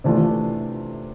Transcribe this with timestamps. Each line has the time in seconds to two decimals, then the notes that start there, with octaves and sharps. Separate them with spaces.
0.04 C3 E3 A3 D4 F4